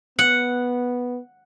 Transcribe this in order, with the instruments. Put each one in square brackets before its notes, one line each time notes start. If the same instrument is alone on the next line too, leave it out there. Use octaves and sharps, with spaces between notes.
[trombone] B3 [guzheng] F#5